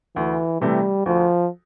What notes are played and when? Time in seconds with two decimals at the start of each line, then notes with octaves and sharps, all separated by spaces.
0.16 D2 E3
0.61 C3 E3 G3 A3
1.06 D2 F3